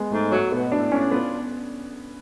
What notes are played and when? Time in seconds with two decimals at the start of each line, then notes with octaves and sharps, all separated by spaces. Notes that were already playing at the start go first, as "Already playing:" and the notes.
Already playing: G#3 B3
0.12 G#2 A3
0.32 F#3 A3
0.52 B2 B3
0.71 A2 D4
0.92 C#4 D4
1.11 B3 F4